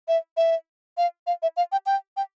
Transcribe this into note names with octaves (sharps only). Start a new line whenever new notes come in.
E5
E5
F5
F5
E5
F5
G5
G5
G5